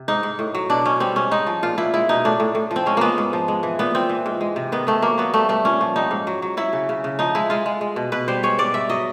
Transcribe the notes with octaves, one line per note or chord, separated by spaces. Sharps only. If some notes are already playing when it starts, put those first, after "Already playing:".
Already playing: C3
G#2 D#4
G#2
A2
F#3
B2 D4
B2 C#4
G3 C4
G#2 C#4
G#3 D#4
F3
A#2 F4
A#2 E4
G#3 E4
B2 D#4
A2 D4
A2
A2
F3
C4
G#3 C#4
G#3 A#3 B3
G#2
F3
G#3
E3
A#2 B3
A#2 C4
E3
G#2
G#3
C3
D#3 B3
D#3 A3
F#3 A#3
F#3 B3
G3 A3
G2 A3
A#2 C#4
F3
G3 D#4
G#2
F#3
F#3
F#3 E4
C#3
C#3
C#3
F3 D#4
G#3 E4
G#3 F4
G#3
G#3
B2
B2 B4
G3 C5
G#3 C#5
G#2 D5
G2 E5
F#3 D#5